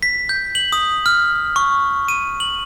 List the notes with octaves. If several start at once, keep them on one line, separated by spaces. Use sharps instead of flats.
B6
G6
F#7
D#6
F6
C#6
D#7
F#7